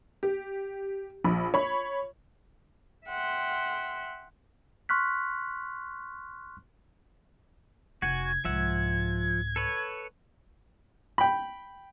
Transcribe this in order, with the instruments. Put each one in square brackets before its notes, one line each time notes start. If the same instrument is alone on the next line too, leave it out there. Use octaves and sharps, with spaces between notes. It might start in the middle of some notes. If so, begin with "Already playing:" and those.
[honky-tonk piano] G4
A#1 B5
C#5 B5
[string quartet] E5 F#5 G5 C6
[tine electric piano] C6 C#6 F6 F#6 B6
[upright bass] F1 [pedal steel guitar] F#4 F#5 G#5 [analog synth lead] G#6
[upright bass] C2 G#2 [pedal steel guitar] F3 E5 F#5
[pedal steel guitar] A4 B4 C#5
[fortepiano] G5 B5